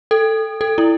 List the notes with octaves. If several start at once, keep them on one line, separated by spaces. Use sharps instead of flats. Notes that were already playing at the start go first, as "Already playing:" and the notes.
A4
A4
E4